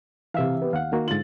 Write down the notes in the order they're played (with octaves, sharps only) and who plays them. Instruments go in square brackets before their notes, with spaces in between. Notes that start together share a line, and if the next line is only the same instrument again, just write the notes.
[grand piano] C3 F5 [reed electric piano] E3 E5
[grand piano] B3 G4
[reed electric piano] D#2 F#5 [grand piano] F5
[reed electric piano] D#3 A#3 F#4
[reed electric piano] G#2 D3 F4 [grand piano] A6 F#7